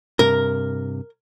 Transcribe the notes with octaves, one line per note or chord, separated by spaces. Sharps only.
G2 C3 A#4